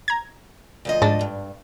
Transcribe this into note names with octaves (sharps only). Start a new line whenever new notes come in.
A#5 G#6
D2 F3 D#5
G#2 D4 A6
G2